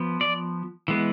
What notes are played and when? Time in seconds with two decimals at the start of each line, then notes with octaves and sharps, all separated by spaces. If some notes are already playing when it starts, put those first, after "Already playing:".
Already playing: F3 B3
0.21 D5
0.88 E3 G#3 B3